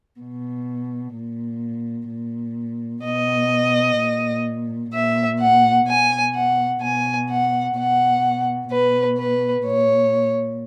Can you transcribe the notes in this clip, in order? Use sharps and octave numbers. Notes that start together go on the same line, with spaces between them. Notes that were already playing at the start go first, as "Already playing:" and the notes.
B2
A#2
A#2
B2 D#5
A#2
A#2 E5
F#5
B2 G#5
F#5
B2 G#5
F#5
B2 F#5
B2 B4
B4
A#2 C#5